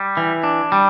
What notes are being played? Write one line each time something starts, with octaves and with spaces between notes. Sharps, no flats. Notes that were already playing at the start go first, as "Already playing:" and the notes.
Already playing: G3
E3
D4
G3